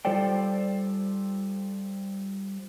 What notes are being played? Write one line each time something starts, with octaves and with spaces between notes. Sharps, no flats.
G3 F4 A4 C5 D5 G5